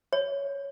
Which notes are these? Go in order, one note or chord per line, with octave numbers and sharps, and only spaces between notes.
C#5